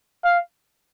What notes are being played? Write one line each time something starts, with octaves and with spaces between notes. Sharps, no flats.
F5